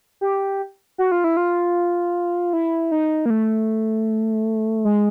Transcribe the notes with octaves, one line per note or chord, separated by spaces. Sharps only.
G4
F#4
F4
E4
F4
E4
D#4
A#3
A3
G#3